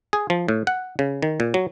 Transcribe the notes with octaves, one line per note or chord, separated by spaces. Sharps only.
G#4
F3
A2
F#5
C#3
D#3
A#2
F#3